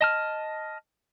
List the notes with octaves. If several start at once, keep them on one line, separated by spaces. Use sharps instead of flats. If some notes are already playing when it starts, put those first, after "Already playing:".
D#5 A5 F6